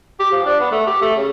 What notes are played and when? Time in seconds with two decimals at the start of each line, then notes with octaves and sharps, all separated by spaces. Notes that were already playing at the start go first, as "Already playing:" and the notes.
0.20 G4
0.32 F3
0.46 D4
0.60 B3
0.72 A3
0.87 G4
1.02 A3
1.17 C#3